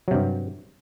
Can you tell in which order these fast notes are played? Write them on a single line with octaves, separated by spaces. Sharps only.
F#3 C3 G2